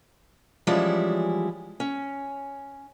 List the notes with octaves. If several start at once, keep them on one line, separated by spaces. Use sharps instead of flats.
E3 F3 G3 G#3 C#4 E4
C#4